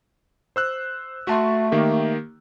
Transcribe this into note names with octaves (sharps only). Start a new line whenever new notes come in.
C5 E6 F#6
A3 F#4 A5 C6
D#3 A#3 G4